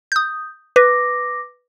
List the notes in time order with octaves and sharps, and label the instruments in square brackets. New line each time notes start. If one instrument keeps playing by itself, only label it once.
[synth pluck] D#6 G6
[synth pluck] B4 [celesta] D6 A#6